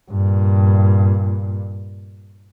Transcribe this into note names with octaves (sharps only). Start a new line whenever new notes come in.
G2 A#2